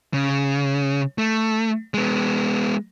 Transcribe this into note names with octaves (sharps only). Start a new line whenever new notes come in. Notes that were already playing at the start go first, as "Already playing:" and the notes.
C#3
A3
G#3 B3